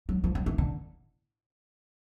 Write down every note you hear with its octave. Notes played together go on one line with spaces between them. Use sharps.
F#3
F3
F#3
E3
D3